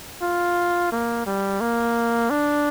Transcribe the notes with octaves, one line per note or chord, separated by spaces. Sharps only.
F4
A#3
G3
A#3
D4